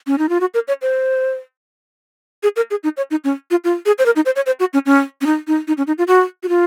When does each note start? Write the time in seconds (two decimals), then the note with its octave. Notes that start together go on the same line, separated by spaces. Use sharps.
0.07 C#4
0.18 D#4
0.29 F4
0.40 F#4
0.54 A#4
0.68 C#5
0.82 C5
2.43 G#4
2.56 A#4
2.71 G#4
2.84 D#4
2.97 C#5
3.11 D#4
3.24 C#4
3.51 F4
3.64 F4
3.86 G#4
3.99 C5
4.06 A#4
4.16 D#4
4.26 C5
4.36 C#5
4.46 C5
4.60 F#4
4.73 C#4
4.86 C#4
5.21 C#4
5.26 D#4
5.47 D#4
5.68 D#4
5.77 C#4
5.87 D#4
5.98 F4
6.08 F#4
6.43 F#4
6.49 F4